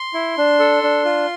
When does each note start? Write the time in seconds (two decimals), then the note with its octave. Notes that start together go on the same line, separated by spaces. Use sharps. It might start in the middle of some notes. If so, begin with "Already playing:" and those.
Already playing: C6
0.14 E4
0.38 D4
0.60 A4
0.83 D4
1.05 F4